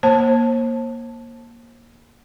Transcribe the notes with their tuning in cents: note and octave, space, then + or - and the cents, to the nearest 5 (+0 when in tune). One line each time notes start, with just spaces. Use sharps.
A#3 +15 C5 +40 A5 +0